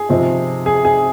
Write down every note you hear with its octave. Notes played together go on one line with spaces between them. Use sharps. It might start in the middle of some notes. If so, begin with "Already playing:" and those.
Already playing: G#4
C3 F3 C4 D#4
G#4
G#4